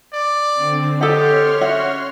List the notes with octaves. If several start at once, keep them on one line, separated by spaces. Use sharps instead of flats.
D5
D3 C4
G4 A4 C#5 D#5 F#5 C6 F6
C#4 F#4 E5 F#5